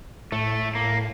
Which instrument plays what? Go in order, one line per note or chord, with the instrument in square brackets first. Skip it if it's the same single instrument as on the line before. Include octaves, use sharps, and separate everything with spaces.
[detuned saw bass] A2 [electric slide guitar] A3
[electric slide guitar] A#3